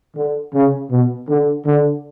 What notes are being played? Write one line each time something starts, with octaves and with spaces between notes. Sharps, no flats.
D3
C#3
B2
D3
D3